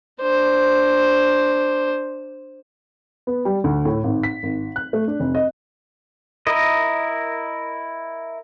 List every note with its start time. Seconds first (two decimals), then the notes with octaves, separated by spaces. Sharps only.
0.22 D4 C5
3.27 B3
3.45 G3
3.64 D2
3.85 A2
4.04 G#1
4.23 B6
4.43 G#1
4.76 F#6
4.93 A3
5.08 D4
5.20 F1
5.35 D#5
6.47 E4 A#4 D#5